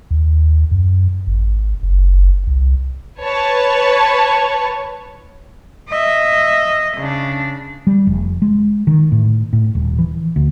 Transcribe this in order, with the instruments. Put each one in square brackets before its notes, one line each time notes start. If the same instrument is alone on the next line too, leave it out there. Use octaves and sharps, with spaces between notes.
[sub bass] D#2
F#2
G#1
F#1
C2
[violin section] B4 C#5 A5
[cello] D#5 E5
C#3 D4
[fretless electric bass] G3
F1
G#3
D#3
A2
A2
D#1
E3
D2